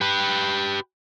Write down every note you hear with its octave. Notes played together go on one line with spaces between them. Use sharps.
G4 B4